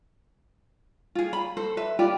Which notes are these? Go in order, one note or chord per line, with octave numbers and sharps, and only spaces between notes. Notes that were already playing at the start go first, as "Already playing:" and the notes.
F4 G#4
B5
A4 C5
B4 E5
F4 G4 B4 D5